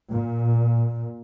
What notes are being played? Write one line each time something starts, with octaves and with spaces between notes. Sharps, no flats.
A#2